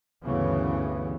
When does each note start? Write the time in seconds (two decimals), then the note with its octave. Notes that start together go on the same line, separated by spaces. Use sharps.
0.23 D2 G2 C#3 E3 B3